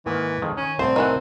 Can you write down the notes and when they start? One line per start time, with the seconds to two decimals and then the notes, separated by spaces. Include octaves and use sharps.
0.06 G#2 D#3 E3 A#3
0.42 F2 D#3 G#3
0.57 D#3 C#4 G#5
0.79 C2 A2 C4 C5 D5
0.96 D#3 E3 F#5